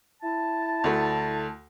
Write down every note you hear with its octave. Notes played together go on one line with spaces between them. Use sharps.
E4 A5
D2 A3